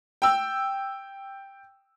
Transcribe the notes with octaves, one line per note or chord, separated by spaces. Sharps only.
G5 E6